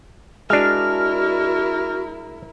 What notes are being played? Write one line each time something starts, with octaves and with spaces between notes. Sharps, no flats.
G#3 D4 E4 F#4 A#4 F6